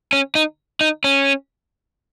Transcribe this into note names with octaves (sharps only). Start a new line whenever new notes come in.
C#4
D#4
D#4
C#4